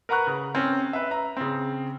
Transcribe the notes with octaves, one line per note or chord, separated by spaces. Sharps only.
A#4 B4 F#5 A#5 C#6 F#6
C#3
C4 C#4
B4 E5
A#5
C#3 C4